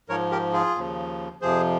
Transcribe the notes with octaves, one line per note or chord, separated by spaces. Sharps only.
G#2 F3 A#4 C#5
G4 A#4
F4 G#4
D#2 C#3 F3
F2 C3 F3 G#4 C5